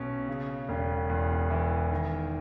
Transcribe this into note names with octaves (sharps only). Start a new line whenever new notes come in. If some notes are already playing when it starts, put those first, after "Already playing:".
Already playing: B1 B2 C#4
C#3
E1
E2
E3
D#3